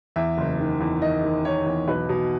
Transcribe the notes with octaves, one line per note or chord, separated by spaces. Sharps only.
E2 E5
F#1
D#3
E2
D#3 D#5
D#3
D#3 C#5
E2
B1 B4
B2